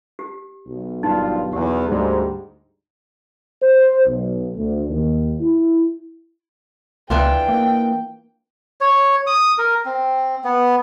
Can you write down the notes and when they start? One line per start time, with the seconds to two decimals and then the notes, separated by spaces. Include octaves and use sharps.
0.19 G4
0.67 B1
1.03 G#1 G2 D#4 F4
1.53 E2 G4
1.88 D2 G#2 G3
3.62 C5
4.06 B1
4.56 D2
4.89 D#2
5.41 E4
7.10 C#2 E3 D4 F4 G5
7.49 A#3
8.81 C#5
9.27 D#6
9.58 A#4
9.85 C4
10.44 B3